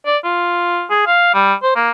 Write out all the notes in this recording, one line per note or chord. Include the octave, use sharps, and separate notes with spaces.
D5
F4
G#4
F5
G3
C5
A#3